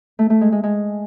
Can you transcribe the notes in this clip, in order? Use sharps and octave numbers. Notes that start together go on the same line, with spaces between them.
A3
A3
G#3
G#3
G#3